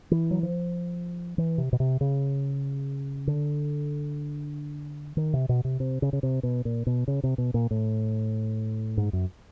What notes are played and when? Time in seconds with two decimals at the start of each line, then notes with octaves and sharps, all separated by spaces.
0.11 E3
0.31 F#3
0.43 F3
1.38 E3
1.58 C3
1.73 B2
1.80 C3
2.01 C#3
3.27 D3
5.17 D#3
5.33 C3
5.49 B2
5.65 C3
5.80 C3
6.02 C#3
6.13 C#3
6.23 C3
6.43 B2
6.65 A#2
6.87 B2
7.08 C#3
7.23 C3
7.38 B2
7.54 A#2
7.71 A2
8.97 G#2
9.13 F#2